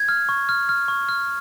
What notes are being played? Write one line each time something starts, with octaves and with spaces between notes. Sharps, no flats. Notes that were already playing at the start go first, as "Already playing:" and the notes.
Already playing: G#6
F6
C#6
F6
F6
C#6
F6